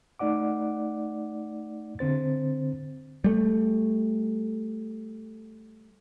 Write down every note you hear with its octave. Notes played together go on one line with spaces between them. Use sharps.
A3 D#4 D5 F#5 D6
D3 C4 C5 A6
G3 A3